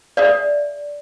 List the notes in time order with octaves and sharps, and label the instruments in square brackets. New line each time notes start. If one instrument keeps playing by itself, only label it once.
[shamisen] G#4 E5 F5 [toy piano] D5